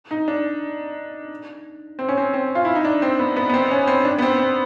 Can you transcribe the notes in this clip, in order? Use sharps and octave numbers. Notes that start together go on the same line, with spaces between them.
D#4
D4
C4
C#4
C4
C4
F4
E4
D#4
D4
C4
B3
B3
B3
C4
C#4
C4
D4
B3
C4
C4